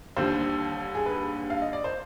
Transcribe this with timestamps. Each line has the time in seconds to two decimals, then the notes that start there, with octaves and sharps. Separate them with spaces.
0.17 D#2 D3 G3 C5
0.95 G#4
1.06 B4
1.50 F5
1.62 D#5
1.73 D5
1.84 C5